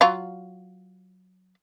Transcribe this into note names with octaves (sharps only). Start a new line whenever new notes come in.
F#3 F4